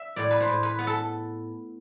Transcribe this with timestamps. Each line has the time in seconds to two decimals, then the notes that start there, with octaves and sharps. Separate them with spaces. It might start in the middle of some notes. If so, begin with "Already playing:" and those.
Already playing: E5
0.16 A2 D5
0.31 B4
0.40 C5
0.48 A2
0.63 B4
0.79 B3
0.87 A4